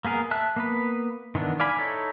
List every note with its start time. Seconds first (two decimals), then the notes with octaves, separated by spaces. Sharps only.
0.05 A#3 B3 G#4 A#4
0.31 E5 A5 F#6
0.56 A#3 B3 B4
1.35 D#3 E3 B3 D4
1.60 D5 F5 G#5 B5
1.78 D#4 E4 A4 C#5